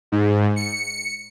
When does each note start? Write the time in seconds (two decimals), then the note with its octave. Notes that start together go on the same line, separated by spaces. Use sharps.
0.12 G#2
0.56 C#7